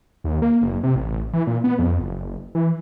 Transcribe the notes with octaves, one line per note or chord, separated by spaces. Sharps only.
D#2
A#3
F#1
C3
A1
E3
A#2
B3
F2
F#1
E3